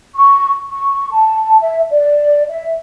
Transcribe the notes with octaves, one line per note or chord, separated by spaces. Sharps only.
C#6
C#6
A5
E5
D5
E5